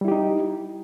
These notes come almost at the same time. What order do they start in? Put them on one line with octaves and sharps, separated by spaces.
G3 E4 G4 D#4